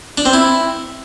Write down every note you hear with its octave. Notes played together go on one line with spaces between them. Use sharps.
D4
C4
E4